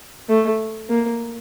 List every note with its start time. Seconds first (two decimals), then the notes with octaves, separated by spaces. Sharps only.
0.29 A3
0.89 A#3